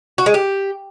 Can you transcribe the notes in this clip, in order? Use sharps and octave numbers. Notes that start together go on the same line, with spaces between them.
F#4
G#3
G4